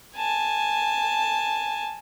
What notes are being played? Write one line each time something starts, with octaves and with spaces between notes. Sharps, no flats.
G#5 A5